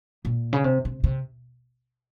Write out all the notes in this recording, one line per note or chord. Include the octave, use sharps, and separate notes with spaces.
A#2
C#3
C3
C3
C3